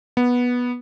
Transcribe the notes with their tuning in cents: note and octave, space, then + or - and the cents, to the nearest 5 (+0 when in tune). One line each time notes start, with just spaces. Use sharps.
B3 -10